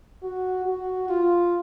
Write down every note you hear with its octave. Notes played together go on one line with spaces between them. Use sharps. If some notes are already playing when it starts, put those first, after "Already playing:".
F#4
F#4
F4